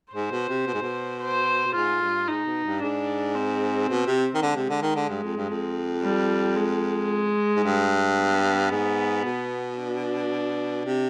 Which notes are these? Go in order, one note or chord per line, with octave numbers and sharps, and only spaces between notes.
G#2 C5
B2
C3
B2
G#2
B2
C5
B2
G#2 F4
G2
G#2 D#4
B2
G2
G#2 D4
C4
B2
C3
D#3
D3 G#3
C3
D3
D#3
D3
G2
F2
G2
F2
G3
G#3
G#2
G2
B3
G#2
B2
D4
C3